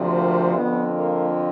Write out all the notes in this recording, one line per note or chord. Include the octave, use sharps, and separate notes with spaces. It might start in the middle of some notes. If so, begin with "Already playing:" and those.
Already playing: D2 C3 F3
A#3
F2 D3 F3 B3
A#3